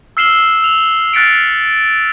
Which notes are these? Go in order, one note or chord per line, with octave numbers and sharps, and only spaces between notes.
E6 F6 C7 E7 F#7 G7
E6 F7 F#7
F6 F#6 A6 B6 C#7 D7